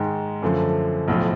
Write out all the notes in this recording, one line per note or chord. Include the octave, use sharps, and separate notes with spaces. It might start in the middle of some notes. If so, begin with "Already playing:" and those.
Already playing: G#2 D#3 G#3
F#2 D3 F3 A3
B1 A2 F3